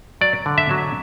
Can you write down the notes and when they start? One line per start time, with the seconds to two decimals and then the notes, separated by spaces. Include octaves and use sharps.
0.21 F#3 D5
0.46 D3
0.58 E5
0.71 F#3